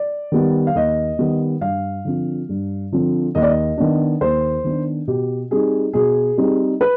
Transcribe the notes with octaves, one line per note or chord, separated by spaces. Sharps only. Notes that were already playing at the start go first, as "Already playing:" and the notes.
Already playing: D5
D#3 G3 B3
F5
D#2 D#5
D#3 G3 B3
G2 F5
D3 F3 C4
G2
D3 F3 C4
D#2 D#5
D5
D#5
D#3 B3 D4
D#2 C5
D#3 B3 D4
B2 G4
G3 C4 D#4 G#4
B2 G#4
G3 C4 D#4
B4